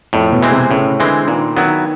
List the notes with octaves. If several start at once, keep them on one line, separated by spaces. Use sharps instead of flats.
F2 A2
B2
E3 G#3 C4
C3
A2 C#3
D3 E3 G#3 C4
A#2 D#3
D#3 F#3 B3 E4